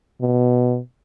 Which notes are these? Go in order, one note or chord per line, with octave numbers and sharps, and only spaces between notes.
B2